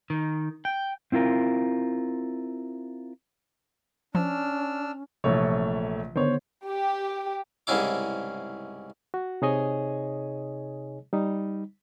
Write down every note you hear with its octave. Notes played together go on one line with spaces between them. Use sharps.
D#3
G5
C4 E4 F4 A#4
F3 C#4 D4 E6 F6
A#1 C3 E3 F3 A3 C#5
D3 D#3 B3 C5 C#5
G4
C2 G#2 C#3 C#4 E4 D6
F#4
C3 D#4 G#4 C#5 D#5 G#5
G3 D#4